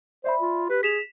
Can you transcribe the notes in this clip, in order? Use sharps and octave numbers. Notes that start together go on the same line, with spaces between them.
C5 D5 E5 B5
F4
G4 B4
G#4 B6 E7 F7